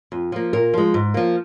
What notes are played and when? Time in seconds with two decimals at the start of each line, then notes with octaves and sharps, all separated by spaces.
0.12 F2
0.32 F3 A#3
0.53 A#2 A#4
0.74 F3 G#3
0.94 G#2
1.14 F3 A#3